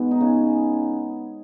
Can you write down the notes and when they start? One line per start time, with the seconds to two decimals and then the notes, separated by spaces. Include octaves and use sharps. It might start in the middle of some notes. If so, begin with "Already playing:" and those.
Already playing: G#2 B2 G#3 B3
0.11 D#4
0.21 C#3 C#4